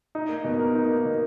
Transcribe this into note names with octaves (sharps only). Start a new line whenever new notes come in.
D#4
A#3
B2
A#4
D#4
A#3
B2